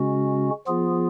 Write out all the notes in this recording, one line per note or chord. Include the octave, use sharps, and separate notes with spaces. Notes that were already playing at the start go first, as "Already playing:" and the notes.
Already playing: C#3 G#3 C#4 F#4
F3 B3 F4 G#4